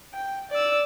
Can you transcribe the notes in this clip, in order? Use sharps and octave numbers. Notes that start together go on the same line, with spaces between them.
G5
D5 E6